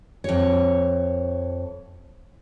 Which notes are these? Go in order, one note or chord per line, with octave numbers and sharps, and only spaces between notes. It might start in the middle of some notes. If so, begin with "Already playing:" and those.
F2 C#5